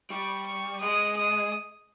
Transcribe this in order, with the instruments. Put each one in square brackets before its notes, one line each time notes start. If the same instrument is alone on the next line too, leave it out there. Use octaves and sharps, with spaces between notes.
[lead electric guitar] G3 [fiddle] C#6
[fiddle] C#6
[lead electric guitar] G#3 [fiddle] D#6
[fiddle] D#6